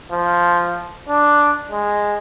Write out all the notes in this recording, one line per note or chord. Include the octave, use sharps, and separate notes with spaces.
F3
D4
G#3